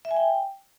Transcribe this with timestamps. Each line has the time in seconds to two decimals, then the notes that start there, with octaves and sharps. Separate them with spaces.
0.05 E5
0.11 G#5
0.17 G5